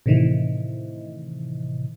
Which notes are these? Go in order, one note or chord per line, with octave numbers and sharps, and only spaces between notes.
A2 C3 D#3 E3